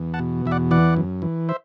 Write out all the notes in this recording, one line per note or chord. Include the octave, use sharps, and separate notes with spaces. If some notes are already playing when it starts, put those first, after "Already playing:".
Already playing: E2
F#5 A5
B2
E2 E5
D5 F#5
E3 D5 F#5
F#2
E3
C5 E5